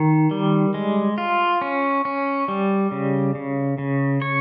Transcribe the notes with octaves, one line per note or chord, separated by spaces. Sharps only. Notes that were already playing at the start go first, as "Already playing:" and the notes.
Already playing: D#3
G3
G#3
F4
C#4
C#4
G3
C#3
C#3
C#3
C#5